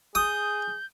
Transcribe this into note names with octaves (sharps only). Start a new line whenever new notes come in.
G#4 D#6 G6